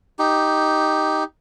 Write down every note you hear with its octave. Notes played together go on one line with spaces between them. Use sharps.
D#4 G4